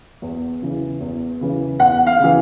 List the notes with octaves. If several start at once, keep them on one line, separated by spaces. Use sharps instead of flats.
E2
C#3 E3
E2
C#3 E3
E2 F#5
F5
C#3 E3